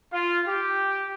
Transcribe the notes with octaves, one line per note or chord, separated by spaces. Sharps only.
F4
G4